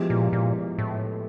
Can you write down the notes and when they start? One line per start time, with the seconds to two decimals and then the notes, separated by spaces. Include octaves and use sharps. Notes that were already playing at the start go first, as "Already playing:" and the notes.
Already playing: F3 G#3 B3 E4 G4
0.10 A#2
0.33 A#2
0.78 A2